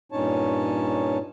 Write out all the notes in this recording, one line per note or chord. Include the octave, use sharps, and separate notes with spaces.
G2 A#2 C#4 D#4 C#5 A5